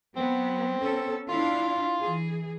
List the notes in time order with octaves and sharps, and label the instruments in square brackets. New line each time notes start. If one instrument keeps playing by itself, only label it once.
[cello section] F#3 B3 [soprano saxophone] C4
[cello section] B3 C#4 A4
[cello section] D4 E4 F5 [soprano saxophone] F4
[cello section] E3 G#4